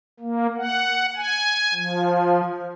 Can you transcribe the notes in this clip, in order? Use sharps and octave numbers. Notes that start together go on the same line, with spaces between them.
A#3
F#5
G#5
F3